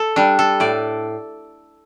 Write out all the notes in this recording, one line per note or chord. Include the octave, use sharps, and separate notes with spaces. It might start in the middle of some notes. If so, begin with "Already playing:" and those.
Already playing: A4
G3 D4
A4
A2 D5